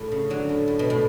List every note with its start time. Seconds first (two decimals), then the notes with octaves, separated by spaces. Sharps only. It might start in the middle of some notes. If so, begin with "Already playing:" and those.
Already playing: A2
0.12 C#3
0.30 D3 F#3
0.49 A2
0.68 A2
0.79 B2
0.90 A2